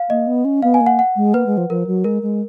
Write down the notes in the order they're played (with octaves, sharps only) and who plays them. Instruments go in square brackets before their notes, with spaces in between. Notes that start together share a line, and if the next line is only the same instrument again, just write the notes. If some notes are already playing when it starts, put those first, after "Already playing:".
Already playing: [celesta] F5
[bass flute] A#3 [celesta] D#5
[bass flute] B3
C#4
[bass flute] B3 [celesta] F5
[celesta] G#5
[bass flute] A#3
[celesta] F#5
F#5
[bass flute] G#3
[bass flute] A#3 [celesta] B4
[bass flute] G#3
F3
[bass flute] F3 [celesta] A#4
[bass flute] F#3
[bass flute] G#3 [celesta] A#4
[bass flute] G#3